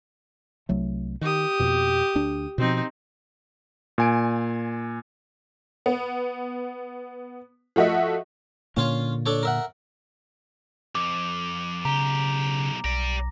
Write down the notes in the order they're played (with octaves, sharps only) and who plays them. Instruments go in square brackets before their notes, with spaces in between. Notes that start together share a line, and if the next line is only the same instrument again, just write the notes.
[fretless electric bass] C2 F#3 A3
[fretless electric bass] D#3 [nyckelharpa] G4 D#6
[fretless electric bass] F2 B2
D2 D4
[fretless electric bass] B2 F3 [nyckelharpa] C4 D#4
[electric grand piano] A#2 G#5 D7
[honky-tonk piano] B3
F3 A3 F#4 D#5 E5
[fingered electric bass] A#2 D3 A#3 [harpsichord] C#4 F4 C#5
[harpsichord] D4 A4 C#5
A#4 E5 F#5
[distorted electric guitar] F2 [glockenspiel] D6
[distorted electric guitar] B1 G4 [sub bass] C#3 [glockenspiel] A#5
[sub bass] B1 [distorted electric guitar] G4 D5 [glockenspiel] A#6